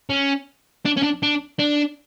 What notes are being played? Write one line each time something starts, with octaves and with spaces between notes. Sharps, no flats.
C#4
D4
C#4
D4
D4
D4